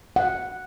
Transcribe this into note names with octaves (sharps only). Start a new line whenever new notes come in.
F#5